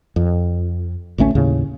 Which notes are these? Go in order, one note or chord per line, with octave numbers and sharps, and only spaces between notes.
F2
A1 D2 A3 C#4
D#2 A2 C#3